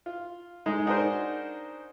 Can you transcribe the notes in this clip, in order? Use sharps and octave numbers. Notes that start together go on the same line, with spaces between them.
F4
G#3 D#4
D4 D#4 F#4 G#4 A#4 C5